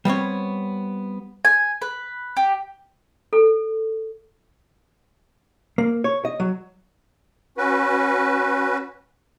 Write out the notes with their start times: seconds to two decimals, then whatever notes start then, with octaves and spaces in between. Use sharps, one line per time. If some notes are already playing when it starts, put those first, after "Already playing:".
0.05 G3 B3 C4 C#5
1.45 G#5
1.82 B4
2.37 G4
3.33 A4
5.78 A#3
6.04 C#5
6.25 D#5
6.40 F#3
7.58 C#4 F#4 B4